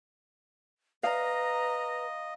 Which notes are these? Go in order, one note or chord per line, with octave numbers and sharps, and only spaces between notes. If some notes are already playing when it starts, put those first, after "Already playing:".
B4 D#5 F5 A#5